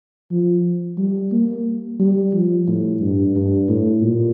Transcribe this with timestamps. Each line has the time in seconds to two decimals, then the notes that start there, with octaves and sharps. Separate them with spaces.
0.31 F3
0.98 G3
1.32 A#3
1.99 G3
2.33 F3
2.68 A2
3.01 G2
3.35 G2
3.68 A2
4.02 A#2